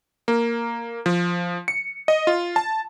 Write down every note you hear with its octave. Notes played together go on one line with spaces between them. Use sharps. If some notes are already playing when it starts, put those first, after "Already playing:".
A#3
F3
C#7
D#5
F4
A5